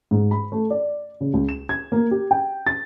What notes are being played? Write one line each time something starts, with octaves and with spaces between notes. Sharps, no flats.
G#2
B5
A3
D5
C#3
C#2
E7
G#6
A#3
G4
G5
A6